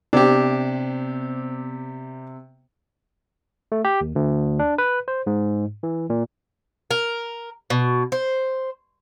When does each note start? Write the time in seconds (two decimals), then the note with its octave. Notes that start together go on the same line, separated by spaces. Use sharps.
0.13 C3 B3 D4 G4 C5
3.72 A3
3.85 G4
4.01 D#2
4.16 D2
4.59 D4
4.78 B4
5.08 C5
5.27 G#2
5.83 E3
6.10 A#2
6.91 A#4
7.70 B2
8.12 C5